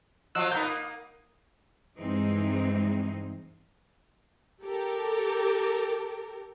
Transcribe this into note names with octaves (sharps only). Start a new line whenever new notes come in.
F3 F#3 F4 D#5 E6 F#6
A#3 B3 D#4 A#5 G6
A#3 D#6
G2 E3 G#3 C4 D#4
G4 A4 A#4